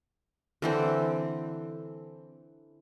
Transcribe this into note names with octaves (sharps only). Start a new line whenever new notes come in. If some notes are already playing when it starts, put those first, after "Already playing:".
D3 E3 C4